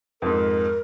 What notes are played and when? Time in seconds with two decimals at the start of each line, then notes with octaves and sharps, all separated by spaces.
0.22 F2 G#2 A#4